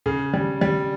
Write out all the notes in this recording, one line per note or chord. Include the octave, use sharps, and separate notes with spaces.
C#3
G3
G3